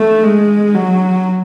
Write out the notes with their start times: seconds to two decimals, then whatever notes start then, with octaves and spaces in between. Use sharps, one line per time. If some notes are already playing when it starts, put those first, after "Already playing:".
Already playing: A3
0.23 G#3
0.75 F#3